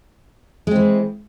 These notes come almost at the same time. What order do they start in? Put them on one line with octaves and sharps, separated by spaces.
G#3 C4 E3